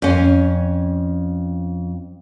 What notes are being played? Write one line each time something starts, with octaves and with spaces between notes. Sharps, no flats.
F2 C#4